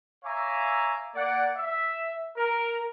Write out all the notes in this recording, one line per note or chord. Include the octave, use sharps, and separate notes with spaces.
C#5 E5 F5 G#5 A#5 D6
A#3 D5 F#5
E5
A#4